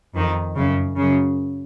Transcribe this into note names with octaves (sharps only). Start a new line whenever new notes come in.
F2 D#3
F#2 C#3
F#2 C#3